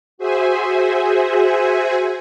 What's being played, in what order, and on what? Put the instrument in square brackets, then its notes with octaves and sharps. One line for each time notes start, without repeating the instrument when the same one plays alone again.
[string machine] F#4 G#4 C5 E5 G#5